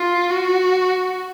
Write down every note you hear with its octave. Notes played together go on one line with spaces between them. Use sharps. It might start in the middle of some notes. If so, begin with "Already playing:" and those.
Already playing: F4
F#4